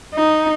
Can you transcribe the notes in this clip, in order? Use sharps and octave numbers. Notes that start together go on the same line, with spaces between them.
D#4